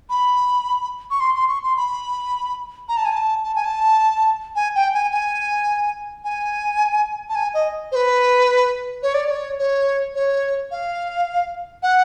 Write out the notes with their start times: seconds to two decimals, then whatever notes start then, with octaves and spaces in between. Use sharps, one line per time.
0.09 B5
1.10 C#6
1.20 C6
1.35 C6
1.49 C#6
1.63 C6
1.77 B5
2.89 A#5
2.97 A5
3.05 G#5
3.12 A5
3.44 A5
3.55 G#5
3.65 A5
4.56 G#5
4.75 G5
4.94 G#5
5.11 G#5
6.24 G#5
7.29 A5
7.35 G#5
7.54 D#5
7.92 C5
7.96 B4
9.03 C#5
9.14 D5
9.26 D5
9.30 C#5
9.59 C#5
10.15 C#5
10.71 F5
11.83 F#5